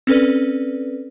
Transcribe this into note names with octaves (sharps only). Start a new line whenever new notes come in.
C4 C#4 A4 B4 D5